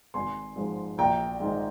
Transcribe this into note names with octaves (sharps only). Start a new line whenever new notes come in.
G#1 G#5 C6
G#2 F3 G#3
A#1 G5 A#5
G#2 D#3 G#3